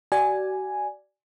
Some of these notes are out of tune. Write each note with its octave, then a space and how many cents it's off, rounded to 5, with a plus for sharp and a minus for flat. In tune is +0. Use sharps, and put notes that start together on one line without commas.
F#4 +40 D5 +0 G#5 +0